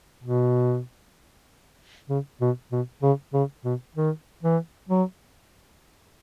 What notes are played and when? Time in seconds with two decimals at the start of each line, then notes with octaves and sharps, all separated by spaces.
0.24 B2
2.09 C#3
2.41 B2
2.72 B2
3.03 C#3
3.34 C#3
3.65 B2
3.96 D#3
4.43 E3
4.89 F#3